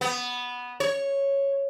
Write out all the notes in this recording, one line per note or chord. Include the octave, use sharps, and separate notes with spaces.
B3
C#5